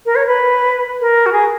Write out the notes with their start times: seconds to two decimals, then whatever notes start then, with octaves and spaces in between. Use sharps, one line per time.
0.05 A#4
0.15 C#5
0.27 B4
1.01 A#4
1.26 F#4
1.32 G#4